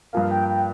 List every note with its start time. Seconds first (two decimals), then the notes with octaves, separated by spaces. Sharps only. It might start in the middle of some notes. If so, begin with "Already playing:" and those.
0.13 G2 F3 A#3 F5
0.31 G5
0.49 G5